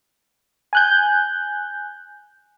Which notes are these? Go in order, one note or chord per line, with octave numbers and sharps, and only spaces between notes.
G#5 F#6 G6